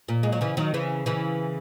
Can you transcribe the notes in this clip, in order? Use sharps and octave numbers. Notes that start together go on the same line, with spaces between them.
A#2
G#3
F#3
C#3 E3
D#3 F#3
C#3 E3
C#3 E3